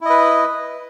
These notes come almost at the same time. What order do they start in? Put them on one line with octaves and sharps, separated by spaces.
E4 D#5 B4